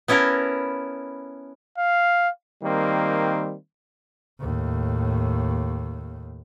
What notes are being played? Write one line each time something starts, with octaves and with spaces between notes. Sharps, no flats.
B3 C#4 E4 A4 A#4
F5
D#3 G3 A#3 C4
D#2 A2